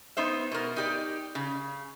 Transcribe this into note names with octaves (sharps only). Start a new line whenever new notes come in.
B3 D#4 C5 E5
B2 A#4
D#4 G4 D5
C#3